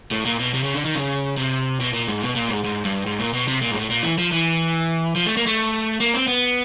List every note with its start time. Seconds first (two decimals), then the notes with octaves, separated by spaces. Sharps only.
0.11 A2
0.25 A#2
0.39 B2
0.54 C3
0.64 C#3
0.74 D3
0.85 D#3
0.95 C#3
1.37 C3
1.80 B2
1.93 A#2
2.08 G#2
2.21 B2
2.36 A#2
2.49 G#2
2.64 G#2
2.85 G2
3.06 G#2
3.19 A#2
3.33 B2
3.48 C3
3.62 A#2
3.71 G#2
3.76 A2
3.90 A#2
4.03 E3
4.18 F3
4.32 E3
5.15 F3
5.26 A3
5.37 A#3
5.47 A3
6.00 A#3
6.14 C4
6.28 B3